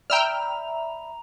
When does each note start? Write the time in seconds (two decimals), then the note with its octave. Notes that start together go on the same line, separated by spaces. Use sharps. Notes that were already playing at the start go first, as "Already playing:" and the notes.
0.10 D5 E5 G5 A#5 B5 E6 F6 F7